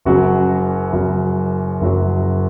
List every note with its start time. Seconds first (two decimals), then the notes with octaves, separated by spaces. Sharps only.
0.05 F#1 F#2 C#3 F#3 F#4
0.93 F#1 F#2 C#3 F#3
1.81 F#1 F#2 C#3 F#3